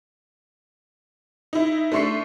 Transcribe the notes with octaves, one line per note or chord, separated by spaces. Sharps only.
D#4 E4
A3 D4 C6 C#6 C7